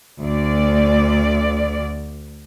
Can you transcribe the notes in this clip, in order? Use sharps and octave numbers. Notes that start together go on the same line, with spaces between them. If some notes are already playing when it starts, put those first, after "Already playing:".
D2 D5